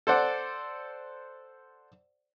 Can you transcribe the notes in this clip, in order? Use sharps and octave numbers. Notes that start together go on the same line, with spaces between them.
A4 C5 D5 F#5